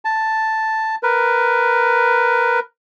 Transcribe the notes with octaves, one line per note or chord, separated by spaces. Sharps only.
A5
A#4 B4